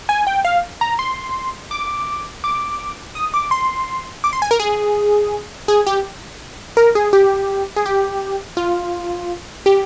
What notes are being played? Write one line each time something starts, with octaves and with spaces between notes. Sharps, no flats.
G#5
G5
F5
A#5
C6
D6
D6
D#6
D6
C6
D6
C6
G#5
A#4
G#4
G#4
G4
A#4
G#4
G4
G#4
G4
F4
G4